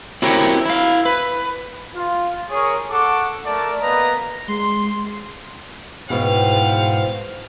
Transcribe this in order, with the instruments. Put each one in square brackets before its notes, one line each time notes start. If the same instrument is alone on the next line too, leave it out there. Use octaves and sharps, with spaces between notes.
[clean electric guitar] C4 E4 F#4 G4 A#4 C#5
E4 F5
B4
[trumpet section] F4
G#4 A#4 C#5
A4 F#5 C#6 D6
A3 A#4 D5 A5
A#3 B3 B4 D#5 A#5
[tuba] G#3 [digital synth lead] C6
[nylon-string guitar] E2 B2 [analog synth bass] G#2 [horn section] B3 F5 [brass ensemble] C5 G5